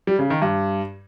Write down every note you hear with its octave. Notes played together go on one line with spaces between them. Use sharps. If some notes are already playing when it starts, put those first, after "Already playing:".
G3
C#3
D#3
G2